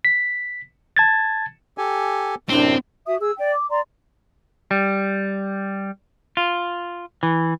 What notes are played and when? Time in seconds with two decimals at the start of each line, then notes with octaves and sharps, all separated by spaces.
0.05 B6
0.97 A5 G#6 A6
1.78 G4 A4 G#5
2.49 F#2 A2 C3 C4 D4
3.07 F#4 E5 D#6
3.20 G#4 E6
3.39 D5 G5
3.53 D6
3.69 D5 A#5 C6
4.71 G3
6.37 F4
7.23 E3